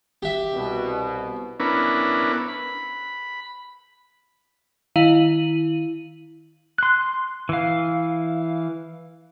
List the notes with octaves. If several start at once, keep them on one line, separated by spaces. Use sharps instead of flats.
G4 E5
C2 B2
B3 C#4 D4 E4 A#4 B4
B5
D#3 E4 F5 D#7 F#7
C6 F#6
E3 F5